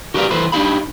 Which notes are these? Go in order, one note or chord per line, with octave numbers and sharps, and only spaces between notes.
F#4 G4 A#4 B4 D5 F5
E3 A4 B4 C5
D4 D#4 G4 F5 B5